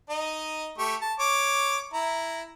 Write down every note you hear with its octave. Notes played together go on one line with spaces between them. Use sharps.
D#4 D#5
A3 G4 C#6
A5
C#5 D6
E4 A#5